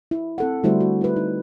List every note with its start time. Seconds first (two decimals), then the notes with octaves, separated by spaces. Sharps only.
0.11 E4
0.38 C4 A4 F#5
0.63 D3 G3 A3 E4 F#4 C5
0.80 F#4
1.01 E4 B4
1.16 D#4